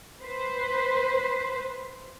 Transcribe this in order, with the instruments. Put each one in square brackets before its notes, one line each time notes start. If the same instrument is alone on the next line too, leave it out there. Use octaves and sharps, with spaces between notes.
[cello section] B4 C5